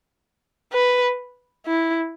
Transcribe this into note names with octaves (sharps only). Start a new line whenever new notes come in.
B4
E4